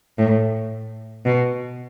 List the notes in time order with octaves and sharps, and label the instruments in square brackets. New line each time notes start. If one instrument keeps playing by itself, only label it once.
[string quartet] A2
B2